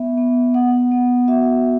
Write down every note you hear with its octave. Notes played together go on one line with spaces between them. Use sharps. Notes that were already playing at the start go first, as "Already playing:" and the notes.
Already playing: B3 E5
B3
B3 F#5
B3
F#4 E5